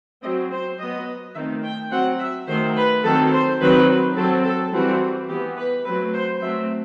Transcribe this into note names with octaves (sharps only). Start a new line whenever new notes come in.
F#3 C4 D#5
C5
F#3 B3 D#5
D#3 A3 C4 E5
G5
F#3 C4 F#5
E5
D#3 F#3 A3 C5
B4
D#3 F#3 C4 A4
C5
D#3 F#3 C4 B4
F#3 C4 A4
A4
E3 G3 C4 F#4
E3 B3 G4
B4
F#3 A3 C4 B4
C5
F#3 A3 C4 E5